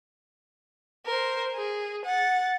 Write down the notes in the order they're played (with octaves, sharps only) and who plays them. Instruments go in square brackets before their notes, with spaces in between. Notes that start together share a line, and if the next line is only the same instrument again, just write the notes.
[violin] A#4 C5
G#4
F#5 A6